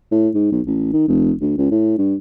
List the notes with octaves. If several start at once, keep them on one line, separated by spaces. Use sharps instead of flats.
A2
G#2
B1
A1
D#3
F1
D2
C#2
A2
G2